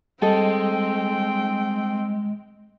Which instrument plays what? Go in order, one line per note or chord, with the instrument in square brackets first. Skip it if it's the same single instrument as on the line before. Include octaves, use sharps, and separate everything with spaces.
[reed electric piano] G3 D#5 [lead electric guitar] G#3 [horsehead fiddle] C4 G5 [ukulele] A4